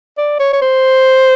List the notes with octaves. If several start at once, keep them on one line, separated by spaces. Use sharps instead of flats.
D5
C#5
C#5
C5